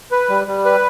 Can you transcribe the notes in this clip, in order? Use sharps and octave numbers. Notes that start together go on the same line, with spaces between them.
B4
G3
G3
B4